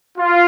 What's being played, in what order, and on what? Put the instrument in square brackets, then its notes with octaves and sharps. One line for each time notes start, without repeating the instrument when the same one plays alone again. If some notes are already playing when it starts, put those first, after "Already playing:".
[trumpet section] F4